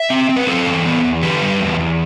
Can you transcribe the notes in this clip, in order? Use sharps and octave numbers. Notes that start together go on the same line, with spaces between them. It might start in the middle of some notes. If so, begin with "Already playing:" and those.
Already playing: E5
C4
C4
B4
C4 A4 C5
E3
B3
E2
D3 G4 B4
G3
E2
E2